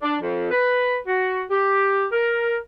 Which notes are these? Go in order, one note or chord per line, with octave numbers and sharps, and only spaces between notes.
D4
F2
B4
F#4
G4
A#4